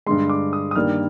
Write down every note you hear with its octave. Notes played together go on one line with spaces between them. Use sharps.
G2 D3 G#3 C6
D6
D#6
D#6
G2 D#3 G3 A#3 F6